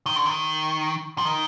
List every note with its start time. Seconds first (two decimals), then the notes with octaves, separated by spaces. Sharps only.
0.06 D#3
0.16 D3
0.25 D#3
1.18 F3
1.25 D#3